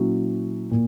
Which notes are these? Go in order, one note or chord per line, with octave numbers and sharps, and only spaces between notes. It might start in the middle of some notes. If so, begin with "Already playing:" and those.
Already playing: A#2 F#3 C#4 E4
A#2